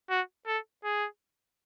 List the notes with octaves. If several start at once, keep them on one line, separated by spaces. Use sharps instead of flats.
F#4
A4
G#4